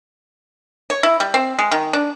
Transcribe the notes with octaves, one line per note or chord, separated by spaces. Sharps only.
C#5
E4
G3
C4
G#3
D#3
D4